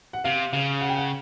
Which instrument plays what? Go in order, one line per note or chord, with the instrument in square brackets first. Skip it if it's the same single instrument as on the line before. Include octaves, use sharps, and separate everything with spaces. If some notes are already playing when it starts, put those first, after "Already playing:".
[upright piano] F#5
[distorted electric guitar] C3 [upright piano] F5
[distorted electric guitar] C#3 [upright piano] F5
[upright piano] F#5
G5
F#5